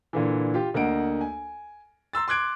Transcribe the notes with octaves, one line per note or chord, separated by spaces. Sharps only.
A#2 D3 E3
F4 G4
D2 A#3 D#5 F#5 D7
G#5
A#5 C6 E6 A6
C6 D6 F#6 G#6 D7